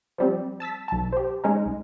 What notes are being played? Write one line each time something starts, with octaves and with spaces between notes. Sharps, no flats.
F3 G3 C4
A5 E6 A6 B6
B1 A5
G4 C5
G#3 C#4 D#4
C2